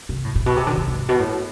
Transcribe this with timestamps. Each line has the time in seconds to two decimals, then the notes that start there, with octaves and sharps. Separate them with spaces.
0.09 C3
0.24 A2
0.35 A2
0.46 B2
0.56 C3
0.67 D3
0.77 C3
0.88 G#2
1.09 B2
1.19 A2